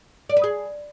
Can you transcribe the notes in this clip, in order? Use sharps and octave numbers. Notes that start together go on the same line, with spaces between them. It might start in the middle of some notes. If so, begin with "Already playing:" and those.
D5
B4
G#4